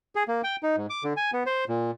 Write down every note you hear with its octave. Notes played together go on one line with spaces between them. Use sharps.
G#4
A#3
G5
D#4
G#2
D6
D3
G#5
B3
C5
A#2